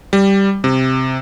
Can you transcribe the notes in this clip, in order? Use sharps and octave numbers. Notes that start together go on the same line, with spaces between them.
G3
C3